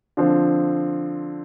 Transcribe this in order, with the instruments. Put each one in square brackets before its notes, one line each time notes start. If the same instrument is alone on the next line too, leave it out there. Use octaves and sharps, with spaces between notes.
[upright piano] D3 F3 C4